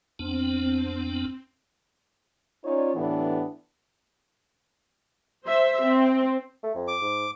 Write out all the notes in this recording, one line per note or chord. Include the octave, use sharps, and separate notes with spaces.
F2 B3 C4 D4
C#4 D#4 F4 C#5 D5
A2 D3 E3 B3 D4 G4
C5 E5
C4
A3
F2
D6
G#2